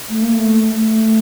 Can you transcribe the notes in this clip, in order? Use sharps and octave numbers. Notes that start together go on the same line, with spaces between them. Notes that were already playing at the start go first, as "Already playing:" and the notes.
A3
A#3
A3
A3